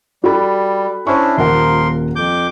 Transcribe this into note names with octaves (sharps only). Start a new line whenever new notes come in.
G3 F#4 A4 B5
C#4 D4 E4 C5 C#6
D#1 F3 A#3 A#4 F#5 C6
F2 D6 G6